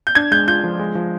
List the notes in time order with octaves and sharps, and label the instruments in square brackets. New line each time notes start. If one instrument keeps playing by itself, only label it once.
[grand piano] G6
[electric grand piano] D4 [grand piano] G#6
[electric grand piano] G#3 [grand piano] G6
[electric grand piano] F4 [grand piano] G6
[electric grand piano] F3
G#3
F3